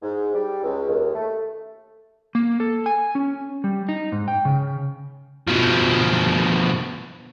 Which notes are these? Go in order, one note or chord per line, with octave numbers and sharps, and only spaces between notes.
G#2
G3
C#2
D#2
A3
A#3
A4
G#5
C#4
G3
D#4
G#2
G5
C#3
B2 F3